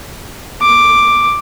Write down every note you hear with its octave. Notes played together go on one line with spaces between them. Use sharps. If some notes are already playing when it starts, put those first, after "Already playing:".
D6